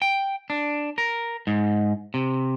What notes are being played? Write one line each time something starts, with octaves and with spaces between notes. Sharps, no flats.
G5
D4
A#4
G#2
C3